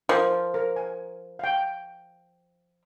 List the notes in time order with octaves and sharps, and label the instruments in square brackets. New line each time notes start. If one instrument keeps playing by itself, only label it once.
[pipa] F3 [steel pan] A#4
[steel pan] A#4
G#5
F5 G5